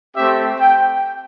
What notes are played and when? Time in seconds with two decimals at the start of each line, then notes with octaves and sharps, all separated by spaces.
0.15 A3 C4 G4 E5
0.60 G5